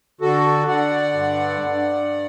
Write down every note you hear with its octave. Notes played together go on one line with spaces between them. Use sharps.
D3 F#4 A4
D3 D5 F#5
G2
G2